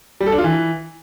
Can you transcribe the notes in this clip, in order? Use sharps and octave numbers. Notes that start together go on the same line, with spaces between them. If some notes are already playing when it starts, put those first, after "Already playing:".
G3
A4
D4
F4
E3